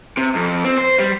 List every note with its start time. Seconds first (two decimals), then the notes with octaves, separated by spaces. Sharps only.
0.17 C3
0.35 F2
0.65 C4
0.77 C5
0.99 G3